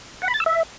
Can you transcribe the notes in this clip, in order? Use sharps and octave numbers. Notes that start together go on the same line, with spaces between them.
F#5
B5
A6
E6
E5